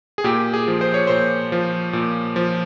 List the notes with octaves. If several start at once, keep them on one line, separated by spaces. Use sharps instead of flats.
G#4
A#2 G4
G#4
F3
C5
C#5
A#2 C5
F3
A#2
F3